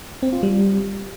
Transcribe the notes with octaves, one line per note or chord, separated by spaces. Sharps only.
C4
F4
G3